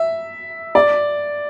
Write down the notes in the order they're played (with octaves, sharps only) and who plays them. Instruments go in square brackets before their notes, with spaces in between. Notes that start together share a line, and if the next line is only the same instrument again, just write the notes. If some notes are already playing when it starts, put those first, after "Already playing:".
Already playing: [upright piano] E5
D5